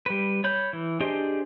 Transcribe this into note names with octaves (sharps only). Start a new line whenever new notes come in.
G3 B4
C#5 B5 G6
E3
D4 G4 G#4 C5 D#5